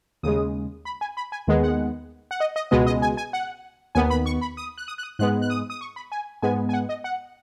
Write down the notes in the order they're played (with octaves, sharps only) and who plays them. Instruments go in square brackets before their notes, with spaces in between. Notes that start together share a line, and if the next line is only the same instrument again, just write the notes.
[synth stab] D#2 C#3 G#3 D#6
B5
G#5
B5
G#5
D#2 D#3 G#3 B3
F#5
F#5
D#5
D#5
C#2 B2 G#3 B3 D#5
D#5
G#5
G#5
F#5
D#2 D#3 B3 G#5
B5
C#6
B5
D#6
F#6
D#6
F#6
D#6
G#2 G#3 B3 F#6
F#6
D#6
D#6
C#6
B5
G#5
G#2 G#3 B3 G#5
G#5
F#5
D#5
F#5